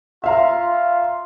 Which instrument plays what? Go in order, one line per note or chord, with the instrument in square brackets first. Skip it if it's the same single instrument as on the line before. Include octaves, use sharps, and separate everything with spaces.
[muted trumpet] F4 [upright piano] E5 F5 A#5